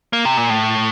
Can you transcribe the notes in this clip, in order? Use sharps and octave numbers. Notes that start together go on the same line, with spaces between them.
A#3
C3
A#2
A2